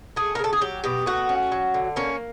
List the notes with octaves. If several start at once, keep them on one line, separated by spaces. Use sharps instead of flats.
A3 G#4
A#4
C#3 A4
G#4
F#3 G4
B2 G4
A3 F#4
C#4
F#3
D3
A#3 C#4